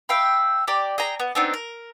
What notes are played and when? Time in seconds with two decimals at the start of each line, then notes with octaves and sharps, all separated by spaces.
0.09 E5 F5 G5 B5
0.67 G4 D5 A#5
0.98 G#4 G5 A#5
1.20 B3
1.35 B3 C4 D4 D#4
1.54 A#4